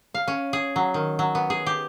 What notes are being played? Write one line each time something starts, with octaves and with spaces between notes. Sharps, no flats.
F5
C#4
G#4
F#3
D#3
F#3
B3
G#4
G4